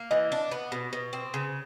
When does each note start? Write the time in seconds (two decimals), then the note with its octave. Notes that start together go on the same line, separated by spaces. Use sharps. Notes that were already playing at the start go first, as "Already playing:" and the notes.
Already playing: A#3
0.11 E3 D#5
0.32 D4
0.51 B3
0.72 B2
0.93 B2
1.13 C4
1.34 C#3